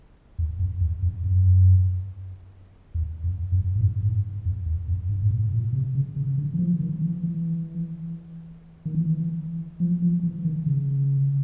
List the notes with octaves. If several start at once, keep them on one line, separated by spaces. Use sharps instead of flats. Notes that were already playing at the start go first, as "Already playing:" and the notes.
E2
F2
E2
F2
F#2
E2
F2
F#2
G#2
G2
G#2
F2
E2
F2
G2
G#2
A2
A#2
C3
C#3
C#3
D3
E3
F3
D#3
E3
E3
D#3
E3
F3
F3
E3
D#3
C#3